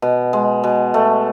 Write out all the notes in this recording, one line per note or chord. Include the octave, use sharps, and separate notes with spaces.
B2
G#3
B2
A3